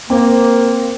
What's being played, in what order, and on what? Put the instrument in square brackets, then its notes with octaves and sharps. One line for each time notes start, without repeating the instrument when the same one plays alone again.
[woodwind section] A#3 [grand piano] C4